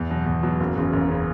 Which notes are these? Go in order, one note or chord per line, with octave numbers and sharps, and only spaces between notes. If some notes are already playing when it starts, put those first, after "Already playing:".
Already playing: E2
B2 F#3
E2
B2 F#3
F#1
E2 C#3
F#1
C#3